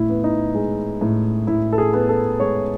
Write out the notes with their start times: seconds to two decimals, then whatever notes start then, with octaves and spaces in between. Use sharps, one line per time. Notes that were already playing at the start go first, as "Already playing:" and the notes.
Already playing: A2 E4
0.09 B3
0.24 D#4
0.55 G#3
1.01 A2
1.47 A2 E4
1.73 A4
1.78 G#4
1.93 B3
2.09 A4
2.40 G#3 C#5